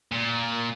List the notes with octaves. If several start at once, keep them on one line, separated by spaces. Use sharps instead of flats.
A#2